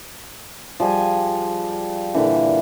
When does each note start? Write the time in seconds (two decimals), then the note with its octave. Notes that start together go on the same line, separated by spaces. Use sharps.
0.80 F3 G3 G#4 G#5
2.14 A#2 D3 E3